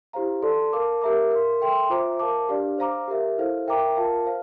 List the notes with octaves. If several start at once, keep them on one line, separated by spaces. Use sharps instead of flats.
E4 G4 C5 F5 A#5
A4 D5 A5 C6
A#4 F5 A5 D6
G4 A#4 E5 A#5 D6
A#4 F5 C6
A4 E5 G5 C6
F4 C5 E5 A#5 D6
A#4 F5 A5 D6
D4 G4 D5 F5
C5 F5 A#5 D6
G4 A#4 E5
E4 A4 C5 F5
A#4 E5 G5 A#5 D6
F4 A#4 F5 A5
C5 F5